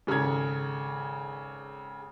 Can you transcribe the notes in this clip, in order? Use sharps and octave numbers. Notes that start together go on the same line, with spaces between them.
G#1 C#3 A4 A#5 G#6